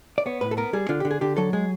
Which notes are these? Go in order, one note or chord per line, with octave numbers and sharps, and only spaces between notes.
D5
B3 C#5
A2 B4
A4
B3 A#4
G3 G#4
D3 F4
D3 G4
G#4
D3 G4
F#3 A4
G#3 G#4